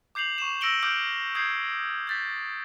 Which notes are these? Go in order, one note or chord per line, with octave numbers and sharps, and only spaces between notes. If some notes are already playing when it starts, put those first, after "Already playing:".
D6 G6 C7 F7 F#7
C#6 E7
E6 A#6 C#7 D7 F#7 G7
D6 F6 G6 D7 F#7
D#6 G6 G#6 C7
G6 A6 B6